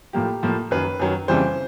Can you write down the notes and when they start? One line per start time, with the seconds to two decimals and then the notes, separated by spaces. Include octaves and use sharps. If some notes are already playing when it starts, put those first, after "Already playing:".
0.13 A2 F3 A#3 G4
0.43 A2 F3 A#3
0.71 F#2 D#3 F#3 B4
0.99 F#2 D#3 F#3
1.28 F2 C#3 E3 G3 C5